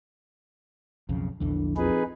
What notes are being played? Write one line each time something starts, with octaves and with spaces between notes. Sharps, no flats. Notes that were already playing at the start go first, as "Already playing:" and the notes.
B1 F2 C#3
A#1 E2 D3 E3
F2 D#4 G#4 B4